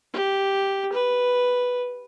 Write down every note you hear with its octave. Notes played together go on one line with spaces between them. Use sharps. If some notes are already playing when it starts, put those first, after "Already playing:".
G4
B4